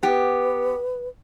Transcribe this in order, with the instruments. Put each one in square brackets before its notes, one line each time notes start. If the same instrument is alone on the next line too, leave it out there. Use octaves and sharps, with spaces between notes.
[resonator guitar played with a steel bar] B3 G4 [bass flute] B4